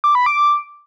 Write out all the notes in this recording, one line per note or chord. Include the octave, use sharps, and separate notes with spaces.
D6
B5
D6